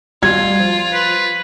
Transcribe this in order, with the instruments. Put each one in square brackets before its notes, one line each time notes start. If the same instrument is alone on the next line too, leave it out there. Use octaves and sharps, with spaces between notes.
[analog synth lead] G3 [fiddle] F4 [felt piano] G#6
[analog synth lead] F3
[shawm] B4